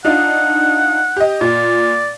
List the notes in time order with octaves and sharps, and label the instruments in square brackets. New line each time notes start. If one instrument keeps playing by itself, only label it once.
[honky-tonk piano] D4 D#4 F4 [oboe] F#5
[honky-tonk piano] G4 D#5
[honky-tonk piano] A#2 [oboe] D5